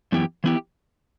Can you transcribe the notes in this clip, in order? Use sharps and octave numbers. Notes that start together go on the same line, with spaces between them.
F#2 E3 B3 E4 G4
E3 B3 E4 G4